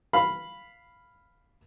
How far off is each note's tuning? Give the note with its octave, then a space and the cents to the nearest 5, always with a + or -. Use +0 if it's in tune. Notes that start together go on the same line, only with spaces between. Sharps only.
F5 -5 B5 +0